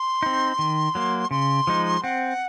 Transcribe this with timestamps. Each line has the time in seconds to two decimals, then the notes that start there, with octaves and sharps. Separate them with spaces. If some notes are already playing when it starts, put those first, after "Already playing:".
Already playing: C6
0.23 C4 D#4
0.59 D#3
0.95 F#3 A#3
1.31 C#3 C6
1.67 F3 G#3 D#4
2.03 C4 F#5